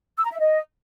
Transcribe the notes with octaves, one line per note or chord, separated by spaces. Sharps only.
E6
A#5
E5
D#5